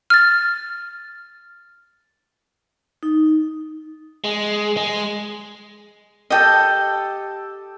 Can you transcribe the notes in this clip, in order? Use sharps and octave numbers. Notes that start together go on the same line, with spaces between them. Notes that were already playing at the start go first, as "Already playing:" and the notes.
F6 A6
D#4
G#3
G#3
G4 A4 D#5 G5 A5